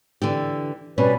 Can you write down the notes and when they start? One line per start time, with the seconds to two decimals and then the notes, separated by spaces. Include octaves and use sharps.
0.22 D3 E3 G4
0.98 B2 G3 C#4 B4 D5